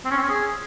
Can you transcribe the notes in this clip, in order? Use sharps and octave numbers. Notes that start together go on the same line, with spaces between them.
C4
C#4
C4
C#4
G#4